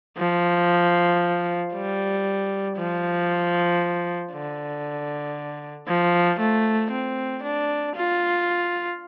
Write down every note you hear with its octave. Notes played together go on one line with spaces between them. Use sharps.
F3
G3
F3
D3
F3
A3
C4
D4
F4